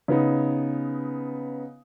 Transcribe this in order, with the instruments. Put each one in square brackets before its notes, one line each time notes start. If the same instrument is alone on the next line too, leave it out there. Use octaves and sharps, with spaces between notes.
[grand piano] C#3 B3 D#4